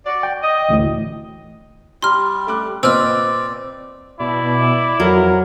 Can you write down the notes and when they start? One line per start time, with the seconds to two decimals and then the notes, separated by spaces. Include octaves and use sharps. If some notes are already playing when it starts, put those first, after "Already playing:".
0.05 F#4 D5
0.23 G5
0.43 D#5
0.69 A1 D2 A2
2.03 G3 G4 A#5 C6 F6
2.47 A3 D6 F#6
2.83 A#2 C4 B4 D5 D#5 E6 F6
4.20 B2 E4 D5
5.00 F2 F#3 A#4